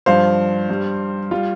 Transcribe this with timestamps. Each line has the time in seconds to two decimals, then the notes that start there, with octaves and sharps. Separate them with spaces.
0.06 G2 F3 C5 F5
0.69 G2 G3
1.31 G3 F4